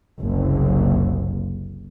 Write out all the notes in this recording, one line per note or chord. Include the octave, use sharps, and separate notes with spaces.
F#1 C2